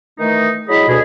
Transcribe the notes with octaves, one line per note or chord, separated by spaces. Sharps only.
D#3 E3 A3 D#4
F#3 G#3 E4 G#4 D#5 B5
D2 B2 G#4